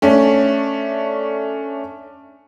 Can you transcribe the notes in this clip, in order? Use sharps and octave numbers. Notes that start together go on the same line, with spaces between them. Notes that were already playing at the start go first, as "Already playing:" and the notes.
A3 C#4 D4